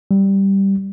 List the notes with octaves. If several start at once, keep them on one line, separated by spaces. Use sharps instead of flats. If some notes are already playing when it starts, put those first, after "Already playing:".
G3